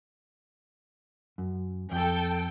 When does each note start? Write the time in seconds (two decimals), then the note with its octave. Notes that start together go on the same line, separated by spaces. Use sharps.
1.38 F#2
1.92 F2 A4 G5